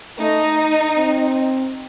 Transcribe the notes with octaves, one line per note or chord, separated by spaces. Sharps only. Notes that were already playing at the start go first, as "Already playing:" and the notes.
A3 D#4
C4